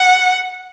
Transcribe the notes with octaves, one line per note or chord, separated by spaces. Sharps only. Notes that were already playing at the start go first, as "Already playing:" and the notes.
Already playing: F#5